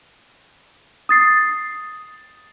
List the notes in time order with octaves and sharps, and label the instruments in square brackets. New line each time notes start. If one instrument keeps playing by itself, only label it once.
[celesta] D#6 A6 C7